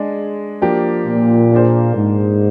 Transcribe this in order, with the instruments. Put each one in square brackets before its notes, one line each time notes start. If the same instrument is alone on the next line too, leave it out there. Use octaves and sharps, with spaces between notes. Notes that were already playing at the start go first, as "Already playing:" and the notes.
Already playing: [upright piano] G#3 D4 G#4
F3 A#3 D4 G4
[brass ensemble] A#2
[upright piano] A#3 D4 G#4 C5
[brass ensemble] G#2